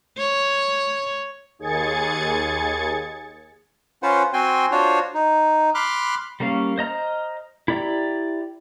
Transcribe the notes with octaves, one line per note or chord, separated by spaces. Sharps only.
C#5
D#2 G#4 G#6 A6 C#7
C#4 F4 B4 C5 F#5
C4 F#4 G5 G#5 C6
D4 F4 F#4 C5 C#5
D#4
B5 C6 D6 F6 F#6
G3 A#3 C#4 F5
C5 D#5 A#5 F6
E4 G4 D5 G5 A#5